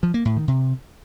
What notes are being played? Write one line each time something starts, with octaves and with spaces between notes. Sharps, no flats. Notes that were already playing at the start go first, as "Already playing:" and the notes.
F3
A#3
A2
D#3
C3